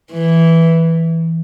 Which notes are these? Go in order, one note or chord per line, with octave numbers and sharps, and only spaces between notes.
E3